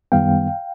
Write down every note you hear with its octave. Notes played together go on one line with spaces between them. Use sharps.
F#2 D#3 G3 B3 F5 G5